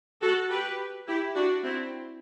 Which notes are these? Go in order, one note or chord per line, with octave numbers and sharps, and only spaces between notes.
F#4 A4
G4 B4
E4 G4
D4 F#4
C4 E4